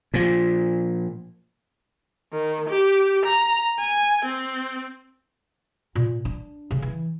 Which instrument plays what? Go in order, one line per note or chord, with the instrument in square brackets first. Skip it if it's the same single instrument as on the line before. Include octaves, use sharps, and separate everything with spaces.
[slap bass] A#2 F3
[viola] D#3
G4
A#5
G#5
C4
[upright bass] A#2
D4
C#3
E3